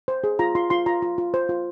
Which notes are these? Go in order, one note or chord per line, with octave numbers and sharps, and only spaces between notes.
C5
G#4
F4 A#5
F4 C6
F4 C6
F4 A#5
F4
F4
C5
F4